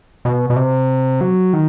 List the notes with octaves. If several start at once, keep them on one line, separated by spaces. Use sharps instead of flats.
B2
B2
C3
F#3
D#3